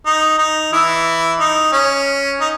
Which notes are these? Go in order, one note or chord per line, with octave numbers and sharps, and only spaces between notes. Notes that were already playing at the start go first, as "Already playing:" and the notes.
D#4
D#4
E3 E4
D#4
C#4
D#4